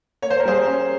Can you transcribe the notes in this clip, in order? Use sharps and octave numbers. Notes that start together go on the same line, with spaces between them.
A#3 C#5
C5
A#4
G3 G#4 C5
C#4